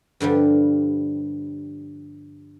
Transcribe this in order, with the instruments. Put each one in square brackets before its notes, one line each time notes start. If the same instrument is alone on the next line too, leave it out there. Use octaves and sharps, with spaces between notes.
[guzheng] G2 D3 F3 G3